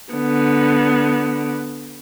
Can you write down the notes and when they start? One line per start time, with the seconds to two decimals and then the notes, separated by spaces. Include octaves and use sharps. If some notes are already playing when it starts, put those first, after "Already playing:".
0.13 D3 B3